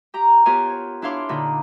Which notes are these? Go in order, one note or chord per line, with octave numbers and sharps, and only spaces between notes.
G4 G5 A#5
B3 F4 G4 A#4 C#5 G#5
C#5
D4 E4 C#5 F5 C6 D6
A#2 D3 D#4 B5